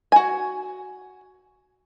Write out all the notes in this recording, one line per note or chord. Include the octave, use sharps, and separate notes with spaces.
F#4 G#5